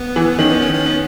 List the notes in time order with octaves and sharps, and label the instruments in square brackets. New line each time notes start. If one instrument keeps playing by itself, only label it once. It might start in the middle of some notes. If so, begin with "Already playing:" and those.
Already playing: [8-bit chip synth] B3
[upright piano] E3
[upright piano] D#3 [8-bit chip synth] C#4
[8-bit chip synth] B3
C#4
C#4
B3